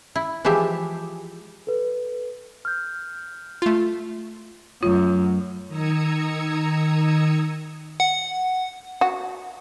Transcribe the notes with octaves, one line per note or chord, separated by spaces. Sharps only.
E4
E3 F3 G#3 G4 E5
A4 B4
F6 G6
A3 F4
F#2 F#3 A3 F4 C#5
D#3 A#5 D#6 E6 G#6 C#7
F#5
F#4